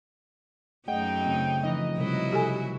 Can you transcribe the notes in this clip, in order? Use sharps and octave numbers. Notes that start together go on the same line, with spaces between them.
F#2 F#3 A3 D#4 G#4 D#5 F#5 G5
C#3 A3 C4
E3 F3 D#4 F4 D#5
C3 F#3 G3 E4 F#4 A#4
C3 G4 A4 G#5